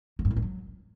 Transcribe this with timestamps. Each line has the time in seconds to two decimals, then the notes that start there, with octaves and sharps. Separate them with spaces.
0.19 F#3
0.25 G2
0.31 A2
0.36 G#3
0.42 F#3